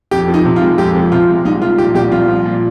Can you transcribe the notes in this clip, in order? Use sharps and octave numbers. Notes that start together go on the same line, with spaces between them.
F2 G4
F3
D#4
C3
F4
G#3
F2 G4
F3
C3 F4
G#3
C2 D#4
F3 F4
A#2 G4
C2 G4
C2 F4
F3
A#2